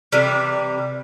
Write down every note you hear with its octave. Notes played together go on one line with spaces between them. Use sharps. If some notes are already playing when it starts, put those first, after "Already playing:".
C3 E3 G3